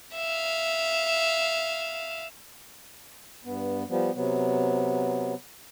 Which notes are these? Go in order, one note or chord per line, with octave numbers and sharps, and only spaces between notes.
E5 F5
G2 B3
F3 G3 B3
C3 F#3 B3